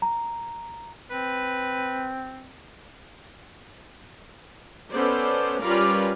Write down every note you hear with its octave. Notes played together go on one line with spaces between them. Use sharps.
A#5
C4 B4
B3 C#4 A4 B4 C5 D5
G3 C#4 F4 A#4 B4 D5